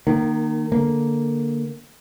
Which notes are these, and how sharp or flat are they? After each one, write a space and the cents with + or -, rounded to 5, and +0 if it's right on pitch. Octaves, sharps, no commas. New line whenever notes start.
D#3 -25 A#3 +0
D3 +5 A#3 +0